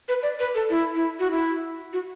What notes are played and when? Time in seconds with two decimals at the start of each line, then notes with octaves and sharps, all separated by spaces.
0.08 B4
0.23 D5
0.39 B4
0.55 A4
0.70 E4
0.95 E4
1.19 F#4
1.31 E4
1.93 F#4